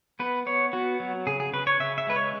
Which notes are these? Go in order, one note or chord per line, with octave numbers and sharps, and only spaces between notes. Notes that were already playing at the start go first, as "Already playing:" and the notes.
B3 B4
B3 C#5
B3 F#4
F#3
C#3 G#4
G#4
C#3 B4
C#5
C#3 E5
E5
G#3 B4
C#5